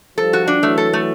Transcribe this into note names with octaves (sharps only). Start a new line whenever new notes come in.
F3 G3 A4
F#4
D4
E3 F#3 A3
A4
A3